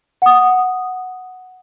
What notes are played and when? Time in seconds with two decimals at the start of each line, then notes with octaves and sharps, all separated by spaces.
0.22 F#5 D#6